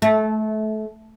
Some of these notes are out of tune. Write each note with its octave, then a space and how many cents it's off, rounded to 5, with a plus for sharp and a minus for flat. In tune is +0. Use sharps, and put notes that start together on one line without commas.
A3 -25